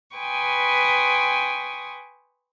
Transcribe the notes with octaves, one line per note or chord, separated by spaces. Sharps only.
B4 G5 G#5 C6 C#6 D#6